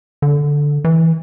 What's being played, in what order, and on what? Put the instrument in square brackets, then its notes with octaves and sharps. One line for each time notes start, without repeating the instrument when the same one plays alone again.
[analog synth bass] D3
E3